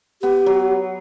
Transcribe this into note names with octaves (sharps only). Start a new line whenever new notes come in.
B3 G4
F#3